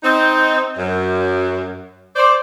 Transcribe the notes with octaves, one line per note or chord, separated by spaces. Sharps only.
C4 D#4
F#2
C5 D5